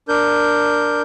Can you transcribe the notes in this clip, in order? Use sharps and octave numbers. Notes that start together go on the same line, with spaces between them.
D4 A#4 G6